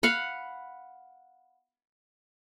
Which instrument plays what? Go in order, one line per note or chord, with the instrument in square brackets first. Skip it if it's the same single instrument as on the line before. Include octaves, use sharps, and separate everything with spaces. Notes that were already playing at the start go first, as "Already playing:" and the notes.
[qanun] F5 F#5 B5